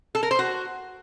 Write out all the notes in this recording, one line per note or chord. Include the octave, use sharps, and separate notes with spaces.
A4
A#4
C5
F#4